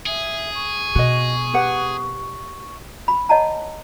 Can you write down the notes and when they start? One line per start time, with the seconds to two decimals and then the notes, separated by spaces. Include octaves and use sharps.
0.06 G#4 E5
0.54 C#6
0.95 B2 F#4 D#5
1.54 G4 B4 F#5
3.08 B5
3.29 C#5 D#5 F#5 A5 A#5